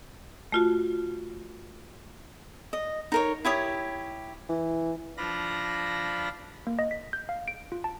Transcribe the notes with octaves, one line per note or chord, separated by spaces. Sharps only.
A3 F4 F#4
D#5
D#4 A#4 C#5
E4 G4 C#5 D#6
E3
F3 D4 F4 B5 A#6
A#3
D#5
B6
G6
F5
D7
F4
A5